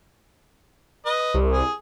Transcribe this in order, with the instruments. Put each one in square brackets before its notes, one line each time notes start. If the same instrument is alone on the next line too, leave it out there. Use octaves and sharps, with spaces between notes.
[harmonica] B4 D#5
[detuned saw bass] C2
[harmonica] G#4